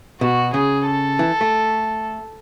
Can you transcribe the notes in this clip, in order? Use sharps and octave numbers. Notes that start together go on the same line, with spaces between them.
B2 F#4
C#3 G#4
A4
E3
A3